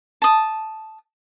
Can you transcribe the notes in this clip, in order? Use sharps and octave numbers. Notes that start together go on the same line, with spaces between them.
A5 D#6